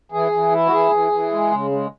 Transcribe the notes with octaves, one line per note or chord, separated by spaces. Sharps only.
E3 G#4
E3
E4
F#4
E3 G#4
E3
E3
G#3
C#3
G#3